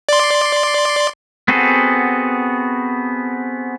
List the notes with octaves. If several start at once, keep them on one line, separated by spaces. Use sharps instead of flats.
D5 C6
B3 C4 F#4 G#4 A4